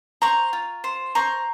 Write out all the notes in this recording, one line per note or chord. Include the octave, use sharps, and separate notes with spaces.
C5 A#5 C#6
F4
C5
C5 A#5 C#6